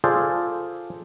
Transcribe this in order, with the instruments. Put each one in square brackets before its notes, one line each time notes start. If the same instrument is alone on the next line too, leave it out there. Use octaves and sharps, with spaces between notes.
[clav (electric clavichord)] F4 G#4 A4 C5 D5